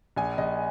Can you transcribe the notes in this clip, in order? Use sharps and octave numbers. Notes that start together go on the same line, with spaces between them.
A#1 G#5
A#1 D#5